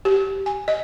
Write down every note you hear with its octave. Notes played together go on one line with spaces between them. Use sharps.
G4
G#5
D#5